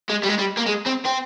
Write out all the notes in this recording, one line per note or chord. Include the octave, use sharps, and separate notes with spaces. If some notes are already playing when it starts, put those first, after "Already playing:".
G#3
G3
G#3
G3
A#3
G#3
C4
C4